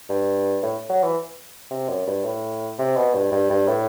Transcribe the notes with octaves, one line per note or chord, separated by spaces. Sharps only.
G2
A2
F#3
E3
C3
F#2
G2
A2
C3
B2
G2
G2
G2
A2